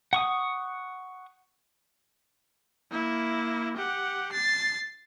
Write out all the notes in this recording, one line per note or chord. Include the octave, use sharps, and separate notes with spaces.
F#5 C#6 D#6
A#3 E4
G4 F#5
A6 C7